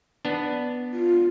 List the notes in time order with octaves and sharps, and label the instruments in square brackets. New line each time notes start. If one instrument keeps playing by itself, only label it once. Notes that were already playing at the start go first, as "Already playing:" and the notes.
[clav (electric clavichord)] B3 D4
[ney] F4